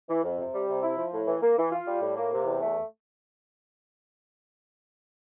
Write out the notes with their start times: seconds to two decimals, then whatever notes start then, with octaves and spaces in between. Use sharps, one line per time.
0.09 E3
0.23 F2
0.38 C3
0.53 G3
0.67 C3
0.82 E4
0.97 F3
1.12 A2
1.27 E3
1.42 A#3
1.57 E3
1.71 F4
1.86 G3
2.00 A2
2.16 A#3
2.31 C3
2.45 E2
2.60 A3